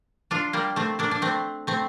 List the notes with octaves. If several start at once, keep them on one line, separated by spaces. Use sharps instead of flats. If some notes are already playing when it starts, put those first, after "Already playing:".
D4 F4
G3 A#3
A3 C4
A#3 D4
D4
A3 C4
A3 C4